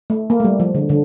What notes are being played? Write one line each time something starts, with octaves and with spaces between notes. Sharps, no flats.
A3
A#3
A3
G3
F3
D3
D3